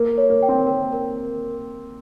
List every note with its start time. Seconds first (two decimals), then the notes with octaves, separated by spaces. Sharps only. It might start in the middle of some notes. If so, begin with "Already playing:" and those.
Already playing: A#3 A#4
0.18 C#5
0.30 A#3
0.42 G5
0.49 C4
0.67 A#4
0.93 A#4